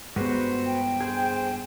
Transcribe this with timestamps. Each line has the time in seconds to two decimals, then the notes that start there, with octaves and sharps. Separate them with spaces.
0.16 G2 G#3 B3 F#4 B4 C5
0.66 G5
1.01 G#4 C5